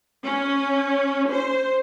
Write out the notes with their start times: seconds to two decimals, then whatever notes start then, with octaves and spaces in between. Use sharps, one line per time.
0.23 C#4
1.31 C5